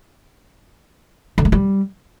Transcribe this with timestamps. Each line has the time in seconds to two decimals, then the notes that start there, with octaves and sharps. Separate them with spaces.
1.38 D3
1.45 G#3
1.52 G3